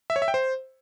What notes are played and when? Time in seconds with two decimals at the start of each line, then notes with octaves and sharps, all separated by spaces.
0.10 E5
0.16 C#5
0.22 E5
0.28 G5
0.34 C5